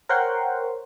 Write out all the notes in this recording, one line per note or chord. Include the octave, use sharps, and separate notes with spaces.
A#4 C5 C#5 F#5 G5 C6